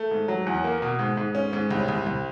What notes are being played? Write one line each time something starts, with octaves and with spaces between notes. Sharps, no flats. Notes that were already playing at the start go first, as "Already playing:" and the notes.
Already playing: A3
G#2
F#3
E2
A#3
B2
G#2
G#2
C#4
G#2
C2
C2
C2